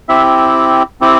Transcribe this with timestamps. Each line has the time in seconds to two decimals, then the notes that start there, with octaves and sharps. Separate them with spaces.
0.09 C4 E4 G4 E5
1.01 C4 E4 G4